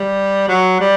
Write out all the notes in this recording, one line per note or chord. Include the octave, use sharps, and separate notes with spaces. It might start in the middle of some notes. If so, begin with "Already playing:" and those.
Already playing: G3
F#3
G3